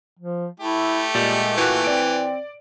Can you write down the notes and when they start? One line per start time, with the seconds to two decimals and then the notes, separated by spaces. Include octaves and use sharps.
0.19 F3
0.60 A3 E4 G4
1.15 A#2 G3 G#3
1.57 E3 F#4
1.85 C4 D5 D7